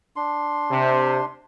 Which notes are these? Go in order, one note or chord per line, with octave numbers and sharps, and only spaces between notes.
D4 C6
C3